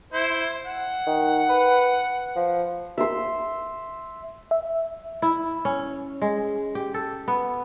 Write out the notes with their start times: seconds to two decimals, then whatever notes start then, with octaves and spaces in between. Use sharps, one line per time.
0.13 E4 C5
0.65 F#5
1.07 D#3
1.49 B4
2.36 F3
2.98 E5 C6
4.51 E5
5.22 E4
5.65 C#4
6.22 G#3
6.75 G4
6.94 A4
7.28 B3